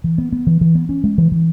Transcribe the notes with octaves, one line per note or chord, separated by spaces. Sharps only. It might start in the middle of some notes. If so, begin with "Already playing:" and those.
E3
B3
B3
E3
E3
B3
C#4
G#3
E3
E3